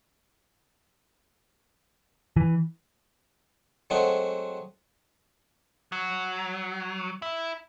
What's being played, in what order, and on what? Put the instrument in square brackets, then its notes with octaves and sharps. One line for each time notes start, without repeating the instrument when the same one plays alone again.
[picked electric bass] E3
[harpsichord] F#3 G#3 A3 C4 F#4
[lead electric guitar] F#3
E4